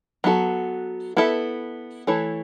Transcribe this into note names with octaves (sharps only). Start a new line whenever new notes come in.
F#3 B3 F#4 A4
B3 E4 A4 E5
E3 A3 E4 A4 C#5